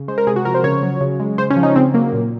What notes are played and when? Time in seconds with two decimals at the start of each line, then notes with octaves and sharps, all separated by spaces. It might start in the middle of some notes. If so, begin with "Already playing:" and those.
Already playing: C#3
0.08 G#3 C5
0.18 A#4
0.27 C3 G#4
0.36 F#4
0.45 F3 A#4
0.54 C5
0.64 C#3 C#5
0.83 F#3
1.01 C#3
1.20 G#3
1.38 C#3 C5
1.50 C#4
1.56 F3
1.63 D#4
1.76 C#3 C4
1.94 F#3 A#3
2.13 A#2